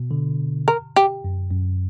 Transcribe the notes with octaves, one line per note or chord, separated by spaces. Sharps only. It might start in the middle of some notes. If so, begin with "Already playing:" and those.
Already playing: B2
D3
A#4
G4
F#2
F#2